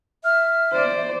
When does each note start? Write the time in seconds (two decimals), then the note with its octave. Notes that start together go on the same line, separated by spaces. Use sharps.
0.24 E5 F6
0.72 C5 D5